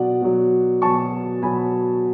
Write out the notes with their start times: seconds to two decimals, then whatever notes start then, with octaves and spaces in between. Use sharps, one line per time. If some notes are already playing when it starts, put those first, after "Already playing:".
Already playing: B2 F#3 D5 F#5
0.22 B2 F#3
0.82 B2 F#3 A5 C#6
1.42 B2 F#3 G#5 B5